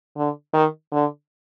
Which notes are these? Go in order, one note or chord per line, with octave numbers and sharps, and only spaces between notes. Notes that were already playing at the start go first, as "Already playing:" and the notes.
D3
D#3
D3